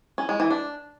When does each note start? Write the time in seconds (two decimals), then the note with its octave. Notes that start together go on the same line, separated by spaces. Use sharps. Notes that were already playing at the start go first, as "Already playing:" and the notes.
0.18 C#4
0.29 G#3
0.40 E3
0.51 D4